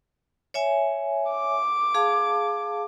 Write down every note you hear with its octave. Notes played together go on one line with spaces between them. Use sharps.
C#5 E5 G#5
D6
G#4 F5 A5